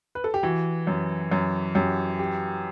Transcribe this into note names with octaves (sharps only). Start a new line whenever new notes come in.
B4
A4
G4
E3 F#4
F#2
F#2
F#2 G4
G4